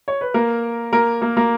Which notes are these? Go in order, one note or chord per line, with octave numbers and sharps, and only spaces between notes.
C#5
B4
A#3 A#4
A#3 A#4
A#3 A#4
A#3 A#4